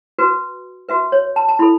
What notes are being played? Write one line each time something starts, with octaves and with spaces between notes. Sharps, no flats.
F#4 B4
F#4 B4 E5
C#5
A5
A5
E4 A4 B5